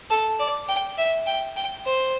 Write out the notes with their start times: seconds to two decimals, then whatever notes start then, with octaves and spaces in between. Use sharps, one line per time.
0.10 A4
0.39 D5
0.69 G5
0.98 E5
1.27 G5
1.56 G5
1.86 C5